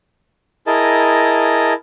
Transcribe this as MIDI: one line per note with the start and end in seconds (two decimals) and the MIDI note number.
0.67 1.73 64
0.67 1.73 68
0.67 1.73 70
0.67 1.73 75
0.67 1.73 81